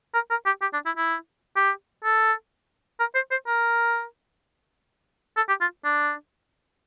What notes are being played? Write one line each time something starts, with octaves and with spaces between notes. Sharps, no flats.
A#4
A#4
G4
G4
D4
E4
E4
G4
A4
A#4
C5
C5
A#4
A4
G4
F4
D4